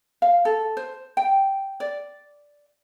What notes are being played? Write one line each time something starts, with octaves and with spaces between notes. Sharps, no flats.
F5
A4
C5
G5
D5